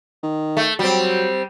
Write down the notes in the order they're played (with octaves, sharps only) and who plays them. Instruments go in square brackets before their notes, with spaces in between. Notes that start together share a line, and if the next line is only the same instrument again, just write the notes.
[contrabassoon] D#3
[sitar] A3
[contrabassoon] F#3 [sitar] G3 C4